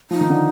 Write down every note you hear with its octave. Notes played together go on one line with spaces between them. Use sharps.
F3 D#4
D#3
D3